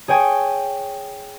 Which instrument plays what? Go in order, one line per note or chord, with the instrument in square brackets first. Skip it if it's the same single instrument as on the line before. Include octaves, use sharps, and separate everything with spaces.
[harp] G#4 C#5 G5 G#5